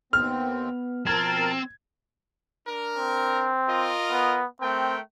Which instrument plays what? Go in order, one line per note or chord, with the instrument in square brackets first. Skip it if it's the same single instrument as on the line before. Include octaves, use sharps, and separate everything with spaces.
[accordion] D#2 C4 [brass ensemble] B3 [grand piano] F6
[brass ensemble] B2 F3 [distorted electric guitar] C4 [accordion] A#4 A5 [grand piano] G#6
[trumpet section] D4 A#4
[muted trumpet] C4
[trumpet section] F4 A#4 D#5
[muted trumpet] B3
[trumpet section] A3 A#4 G5 [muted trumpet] C4